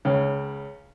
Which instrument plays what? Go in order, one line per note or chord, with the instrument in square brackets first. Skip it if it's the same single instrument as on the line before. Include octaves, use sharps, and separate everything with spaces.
[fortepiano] C#2 C#3